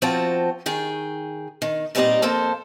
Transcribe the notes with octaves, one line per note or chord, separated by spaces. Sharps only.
F3 C4 F4 F#4 G5 A5
D#3 G#4 G5
D#3
A#2 G3 C4 D#4 D5 D#5
F2 A#3 A4 C5